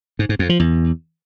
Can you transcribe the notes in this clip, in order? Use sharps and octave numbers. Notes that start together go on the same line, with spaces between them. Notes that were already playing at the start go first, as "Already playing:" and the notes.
G#2
G#2
F2
F3
E2